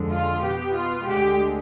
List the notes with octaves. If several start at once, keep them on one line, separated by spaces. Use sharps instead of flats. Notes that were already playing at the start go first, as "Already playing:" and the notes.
Already playing: F2 D3 F3 G#3
F4
B2 B3 G4
F4
D2 D3 G#3 G4